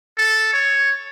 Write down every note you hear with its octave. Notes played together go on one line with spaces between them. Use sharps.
A4
C#5